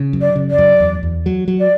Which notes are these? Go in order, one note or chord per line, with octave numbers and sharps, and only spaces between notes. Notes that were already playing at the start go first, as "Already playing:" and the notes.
Already playing: C#3
F#2
D5
C#3
D5
F#2
E2
E2
F#3
F#3
D5